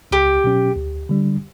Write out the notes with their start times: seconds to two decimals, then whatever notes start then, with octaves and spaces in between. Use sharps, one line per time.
0.11 C#2 G4
0.44 B2 F#3 C#4
0.76 D2
1.09 D3 G3 D4